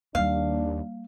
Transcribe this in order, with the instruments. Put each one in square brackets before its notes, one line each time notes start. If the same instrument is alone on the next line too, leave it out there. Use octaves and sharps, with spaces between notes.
[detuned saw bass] D#2 [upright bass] G3 A#3 [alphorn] D4 [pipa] F5